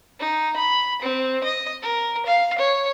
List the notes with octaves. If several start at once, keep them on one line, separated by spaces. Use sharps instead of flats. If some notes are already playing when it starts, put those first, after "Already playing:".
D#4
B5
C4
D#5
A#4
F5
C#5